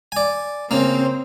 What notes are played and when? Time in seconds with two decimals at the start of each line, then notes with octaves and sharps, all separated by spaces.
0.12 D5 G#5
0.71 C#3 A#3 C4